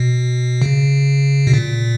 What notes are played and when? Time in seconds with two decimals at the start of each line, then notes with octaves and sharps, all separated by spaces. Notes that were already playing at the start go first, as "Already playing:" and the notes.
Already playing: B2
0.62 C#3
1.47 B2
1.53 A#2